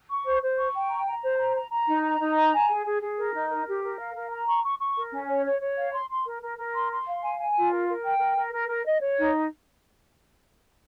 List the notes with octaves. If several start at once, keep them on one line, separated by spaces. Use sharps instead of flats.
C#6
C5
C5
C#6
G5
A#5
A#5
C5
A#5
A#5
A#5
D#4
A#5
D#4
A#5
G#5
G#4
G#4
G#4
A#4
D#4
A#4
G4
A#4
F5
A#4
A#5
C#6
C#6
C#6
A#4
C#4
C#5
C#5
C#5
F5
C6
C6
A#4
A#4
A#4
C6
C6
F5
G#5
G#5
F4
A#4
A#4
G5
A#4
A#4
A#4
A#4
D#5
C#5
D#4